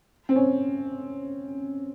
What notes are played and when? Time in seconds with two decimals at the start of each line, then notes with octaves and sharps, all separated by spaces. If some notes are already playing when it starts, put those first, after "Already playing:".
0.29 C4
0.36 C#4